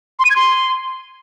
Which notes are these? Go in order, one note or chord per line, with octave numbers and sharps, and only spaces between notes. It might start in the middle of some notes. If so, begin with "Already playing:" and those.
C6
D#7
G#6
C6